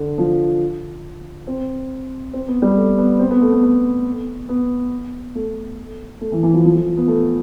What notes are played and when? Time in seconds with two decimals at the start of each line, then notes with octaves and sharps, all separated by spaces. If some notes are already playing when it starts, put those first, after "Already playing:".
Already playing: D3
0.18 F3
1.47 C4
2.33 C4
2.48 B3
2.62 G3
2.76 A3
2.98 B3
3.19 C4
3.31 B3
3.41 A3
3.52 B3
3.63 B3
4.49 B3
5.35 A3
6.21 A3
6.32 E3
6.43 E3
6.54 F3
6.65 F3
6.75 F3
6.97 B3
7.08 A3